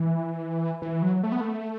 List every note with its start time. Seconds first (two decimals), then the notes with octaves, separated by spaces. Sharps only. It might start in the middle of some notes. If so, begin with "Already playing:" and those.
Already playing: E3
0.82 E3
1.02 F#3
1.23 A3
1.32 B3
1.41 A3